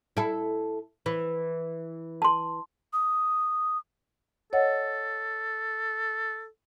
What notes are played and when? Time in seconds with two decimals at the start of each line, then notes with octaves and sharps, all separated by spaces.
0.17 E4 A4
1.06 E3
2.22 A5 C6
2.93 D#6
4.53 A4 C#5 D#5 F#5